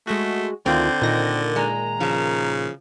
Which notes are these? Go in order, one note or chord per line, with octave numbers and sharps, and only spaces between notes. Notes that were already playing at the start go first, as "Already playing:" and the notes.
G#3 A3 F#4
D2 D3 D#3 C4 F4 G6
A#2 D#3 A#6
G#3 A#5
C#3 F3